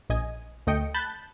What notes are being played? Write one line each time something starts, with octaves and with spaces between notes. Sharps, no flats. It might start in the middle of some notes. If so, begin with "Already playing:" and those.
A#1 D#5 G#5
D2 A3 D#5 G5 C#7
A5 B5 F#6 G6 A6